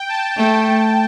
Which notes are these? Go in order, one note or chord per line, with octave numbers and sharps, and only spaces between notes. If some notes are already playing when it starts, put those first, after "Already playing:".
Already playing: G5
A5
A3 G5